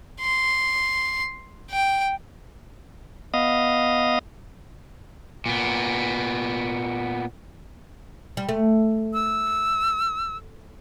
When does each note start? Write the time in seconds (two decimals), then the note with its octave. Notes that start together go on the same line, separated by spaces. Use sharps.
0.20 C6
1.71 G5
3.34 B3 D#5 F5 D#6
5.46 A#2 B3
8.37 G3
8.49 A3
9.14 E6